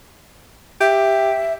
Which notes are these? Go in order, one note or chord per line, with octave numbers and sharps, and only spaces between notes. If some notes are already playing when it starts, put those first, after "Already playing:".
G4 E5